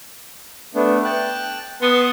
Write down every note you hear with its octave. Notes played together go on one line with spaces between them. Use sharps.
A3 B3 D4
G5 A5 F#6
B3 A5 C6 D#6